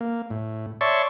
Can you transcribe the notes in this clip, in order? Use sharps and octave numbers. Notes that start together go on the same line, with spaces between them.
A#3
A2
C#5 D5 E5 A5 C6 C#6